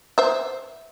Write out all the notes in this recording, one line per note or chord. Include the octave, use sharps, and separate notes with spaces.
C5 E5